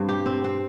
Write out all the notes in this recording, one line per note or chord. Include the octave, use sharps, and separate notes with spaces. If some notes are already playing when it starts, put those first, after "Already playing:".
Already playing: G2 C4
G4
C4
C4